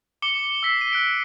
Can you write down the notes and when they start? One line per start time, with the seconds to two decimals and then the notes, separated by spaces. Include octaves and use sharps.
0.22 D6 C#7 G7
0.63 E6 B6 C7
0.81 D#7
0.93 F#6 D7